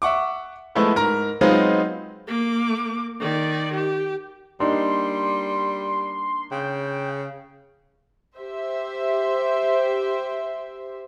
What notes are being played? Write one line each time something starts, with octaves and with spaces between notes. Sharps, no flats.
E5 F#5 C#6 D6
F3 G#3 A3 B3 E4 B4
G#2 A#4 A#5
F#3 G#3 B3 C4 D#4 F4
A#3 D6
D#3 D5
G4
G3 A#3 D4 D#4 C6
C#3 G5
G4 C5 E5